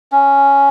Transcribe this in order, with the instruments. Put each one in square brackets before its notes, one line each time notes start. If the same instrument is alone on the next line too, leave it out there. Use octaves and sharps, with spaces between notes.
[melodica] C#4